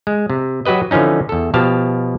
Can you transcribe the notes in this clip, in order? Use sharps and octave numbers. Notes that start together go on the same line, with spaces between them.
G#3
C3
F#3 F#4 G4 B4 D#5
D3 E3 F3 C#4 D#4
E2 A4
B2 F3 G4 F5 A5